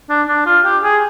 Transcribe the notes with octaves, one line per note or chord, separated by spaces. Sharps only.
D4
D4
F4
G4
G#4